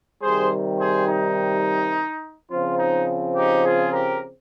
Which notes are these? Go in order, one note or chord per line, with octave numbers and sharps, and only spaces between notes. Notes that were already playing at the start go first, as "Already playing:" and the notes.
C3 D#3 G3 G#4 C5
G#4 C5
D#4
C#3 F3 C4 F4
D#4
D#4 G4
F4 G#4
G4 A#4